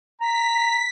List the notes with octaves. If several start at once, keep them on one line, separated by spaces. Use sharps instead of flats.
A#5 B6